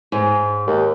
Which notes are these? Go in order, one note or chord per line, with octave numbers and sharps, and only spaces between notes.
G#2
D#2